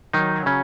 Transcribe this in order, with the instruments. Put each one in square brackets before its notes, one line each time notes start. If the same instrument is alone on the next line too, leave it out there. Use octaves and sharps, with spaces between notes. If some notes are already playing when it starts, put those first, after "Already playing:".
[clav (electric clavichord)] D#3 D#4 [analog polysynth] F#3
[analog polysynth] F#3
[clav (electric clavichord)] C#3 C#4